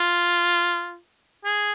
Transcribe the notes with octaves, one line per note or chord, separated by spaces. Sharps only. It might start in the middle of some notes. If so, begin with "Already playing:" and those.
Already playing: F4
G#4